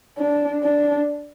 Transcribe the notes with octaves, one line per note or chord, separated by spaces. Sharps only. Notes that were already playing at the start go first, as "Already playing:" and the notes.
D4
D4